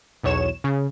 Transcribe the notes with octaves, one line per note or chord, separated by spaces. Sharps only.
B1 E2 C#5 E7
C#3